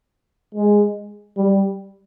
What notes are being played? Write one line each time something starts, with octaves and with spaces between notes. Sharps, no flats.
G#3
G3